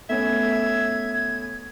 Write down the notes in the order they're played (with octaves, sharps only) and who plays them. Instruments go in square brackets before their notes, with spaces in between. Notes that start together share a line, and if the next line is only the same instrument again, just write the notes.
[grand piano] A3 B3 C#4 [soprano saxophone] E5 [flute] G#6